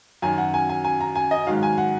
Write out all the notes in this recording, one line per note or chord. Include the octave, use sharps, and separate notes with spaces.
F#2 D#3 F#3 G#5
F#5
G#5
G#5
G#5
A#5
G#5
D#5
G#2 D#3 F#3 F5
G#5
F#5